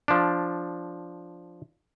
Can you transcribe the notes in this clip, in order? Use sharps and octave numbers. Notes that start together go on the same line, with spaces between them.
F3 D4